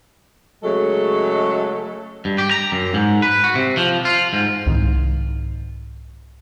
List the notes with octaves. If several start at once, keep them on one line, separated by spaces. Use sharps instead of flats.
C#3 F#3 G#3 A3 A4
G2
G4
A#5
F#2
G#2
B4
F#4
C3
F3
F4
G#2
C2 G#2 D#3